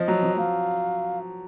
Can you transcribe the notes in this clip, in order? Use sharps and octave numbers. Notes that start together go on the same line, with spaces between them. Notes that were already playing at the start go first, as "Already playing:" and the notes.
Already playing: F3 D#5
F#3
F3
F#3 F5